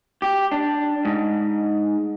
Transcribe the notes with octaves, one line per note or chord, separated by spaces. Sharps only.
G4
D4
G#2